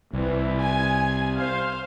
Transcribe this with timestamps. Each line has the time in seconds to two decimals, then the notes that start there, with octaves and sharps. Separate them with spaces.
0.13 C2 E3
0.58 G#5
1.35 C5 F5